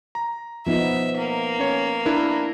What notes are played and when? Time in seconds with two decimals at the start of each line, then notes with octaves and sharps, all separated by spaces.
0.15 A#5
0.67 F3 B3 D#4 E5
1.18 A#3
1.59 C#4 C#5
2.06 D4 E4 A#4